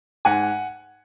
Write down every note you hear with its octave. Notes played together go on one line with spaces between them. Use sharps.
G#2 F#5 G#5